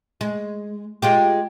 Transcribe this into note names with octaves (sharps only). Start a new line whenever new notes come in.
G#3
G#3 F4 G4